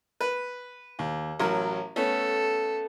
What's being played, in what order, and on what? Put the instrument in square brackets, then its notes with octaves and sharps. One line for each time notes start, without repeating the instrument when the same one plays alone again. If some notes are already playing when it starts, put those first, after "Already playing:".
[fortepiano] B4
D#2
A1 F#3 A#4
[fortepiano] A3 B3 C#4 [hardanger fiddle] A4